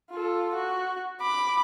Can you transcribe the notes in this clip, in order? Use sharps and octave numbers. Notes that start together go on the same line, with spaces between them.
F4 A4
F#4
B5 D6